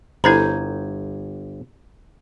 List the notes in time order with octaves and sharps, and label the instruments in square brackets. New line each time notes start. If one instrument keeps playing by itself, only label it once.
[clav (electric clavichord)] G1 G#5 [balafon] E4 A4 C5 [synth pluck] A#5 G6 G#6